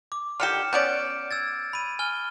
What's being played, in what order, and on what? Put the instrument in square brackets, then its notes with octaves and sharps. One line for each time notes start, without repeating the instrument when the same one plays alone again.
[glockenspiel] D6
[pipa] D3 D#3 G4 [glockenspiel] F6 C#7 E7
[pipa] B3 C#4 D5 [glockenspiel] G6 D7
[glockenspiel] E6 G#6 A6
B5 D#7
G#5 F6 G7